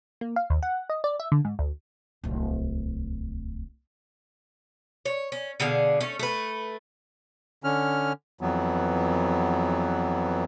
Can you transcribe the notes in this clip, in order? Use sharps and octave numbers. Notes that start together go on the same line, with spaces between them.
A#3
F5
D#2
F#5
D#5
D5
E5
D3
G#2
D2
D1 C2
C#5
C#4
B2 D3 G#4 F5
A3 C#4
A3 B4
D3 C#4 F6
F2 E3 F#3 B3